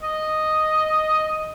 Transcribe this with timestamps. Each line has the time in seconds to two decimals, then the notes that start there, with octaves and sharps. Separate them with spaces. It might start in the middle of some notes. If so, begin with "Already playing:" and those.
0.03 D#5